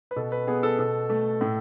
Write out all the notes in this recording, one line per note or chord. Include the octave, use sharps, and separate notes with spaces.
B4
B2 A4
B4
B3 G#4
A4
B2 A4
A3
A2